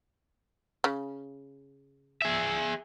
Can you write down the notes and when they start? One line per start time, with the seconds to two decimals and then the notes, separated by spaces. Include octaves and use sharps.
0.84 C#3
2.22 G#4 E5